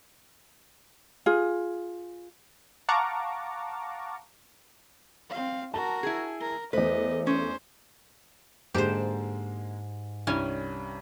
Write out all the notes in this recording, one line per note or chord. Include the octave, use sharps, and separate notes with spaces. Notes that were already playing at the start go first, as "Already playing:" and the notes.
F4 G#4
F5 F#5 A5 A#5 C#6 D6
C4 F5
F#4 A#4 A5
E4 G#4
A#4
E2 A3 B4 C5 D#5
C#4 C5
G#2 D3 G#3 A#3 G4 C5 A5
C2 G2 G3 C#4 G#5